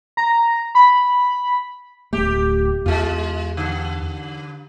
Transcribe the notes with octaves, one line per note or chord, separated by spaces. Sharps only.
A#5
B5
D1 A3 G4
E2 G#3 F4
D3